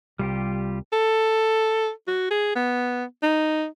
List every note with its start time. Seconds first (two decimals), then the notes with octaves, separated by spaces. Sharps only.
0.19 C2 G3 F4 G4
0.93 A4
2.08 F#4
2.31 G#4
2.55 B3
3.23 D#4